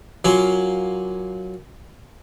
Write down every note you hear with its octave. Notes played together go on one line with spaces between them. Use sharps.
F#3 A#3 C#4 F4